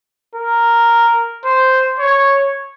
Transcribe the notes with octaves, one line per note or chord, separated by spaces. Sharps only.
A#4
C5
C#5